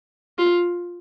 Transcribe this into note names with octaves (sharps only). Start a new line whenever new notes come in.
F4